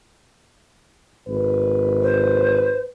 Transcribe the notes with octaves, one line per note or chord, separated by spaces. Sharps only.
G#1 B4
C5